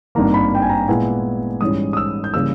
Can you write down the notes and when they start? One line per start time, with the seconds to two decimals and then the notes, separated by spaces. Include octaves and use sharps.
0.15 G#1 G2 D#3 A#3 A#5
0.34 B5
0.55 G5
0.62 G#5
0.69 A#5
0.88 A#2 G#3 B3 E4 G#5
1.61 G#2 E3 G3 C#4 E4 D#6
1.93 D#6
1.97 E6
2.24 G6
2.34 C#3 E3 G3 A#3 E6